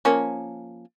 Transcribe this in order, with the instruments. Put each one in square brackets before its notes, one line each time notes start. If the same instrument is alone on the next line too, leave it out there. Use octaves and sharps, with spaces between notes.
[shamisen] F3 A#3 C#4